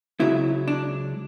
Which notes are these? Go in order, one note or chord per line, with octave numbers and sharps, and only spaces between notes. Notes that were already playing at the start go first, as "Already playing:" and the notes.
C#2 C#3 F#3 E4
D4